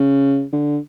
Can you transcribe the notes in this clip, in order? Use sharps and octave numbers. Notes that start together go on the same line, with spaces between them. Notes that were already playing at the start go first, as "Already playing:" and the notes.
Already playing: C#3
D3